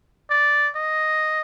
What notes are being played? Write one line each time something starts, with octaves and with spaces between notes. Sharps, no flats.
D5
D#5